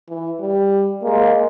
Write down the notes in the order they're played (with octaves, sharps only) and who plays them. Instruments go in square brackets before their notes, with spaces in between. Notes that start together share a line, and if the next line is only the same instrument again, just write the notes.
[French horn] E3
G3
[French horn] G#3 [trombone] A#3